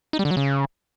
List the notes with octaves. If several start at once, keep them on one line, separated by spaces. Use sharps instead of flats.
D#4
G3
D3
F#3
C#3